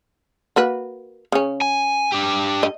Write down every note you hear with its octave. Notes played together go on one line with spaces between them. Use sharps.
A#3 F#4 B4
C#3 C#4
G#5
D4 G4
D#5